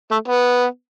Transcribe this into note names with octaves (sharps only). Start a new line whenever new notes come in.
A3
B3